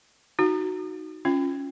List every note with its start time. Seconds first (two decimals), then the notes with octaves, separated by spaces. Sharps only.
0.39 D#4 F#4
1.25 C#4 F4